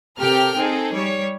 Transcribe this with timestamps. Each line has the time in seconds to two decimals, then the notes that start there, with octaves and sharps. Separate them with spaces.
0.19 C3 G4 A4 A#4 G5 F6
0.57 C4 D#4 G#4 A4
0.93 G3 C#5